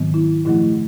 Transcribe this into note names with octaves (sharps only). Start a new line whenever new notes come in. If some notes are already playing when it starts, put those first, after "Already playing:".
Already playing: G#2 D#3 F#3 B3
E4
A#2 F3 A3 E4